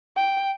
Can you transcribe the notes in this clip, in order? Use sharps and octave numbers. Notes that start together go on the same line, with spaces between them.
G5